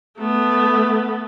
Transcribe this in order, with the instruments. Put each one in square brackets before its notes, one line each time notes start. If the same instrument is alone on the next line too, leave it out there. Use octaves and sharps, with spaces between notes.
[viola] A3 B3